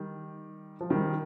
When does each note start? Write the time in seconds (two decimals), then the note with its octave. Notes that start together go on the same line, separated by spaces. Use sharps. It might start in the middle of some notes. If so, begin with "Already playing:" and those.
Already playing: D#3 G3
0.81 F3
0.90 D#3 G3